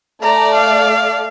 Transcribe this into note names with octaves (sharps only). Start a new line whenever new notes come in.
A3 D5 A#5
F5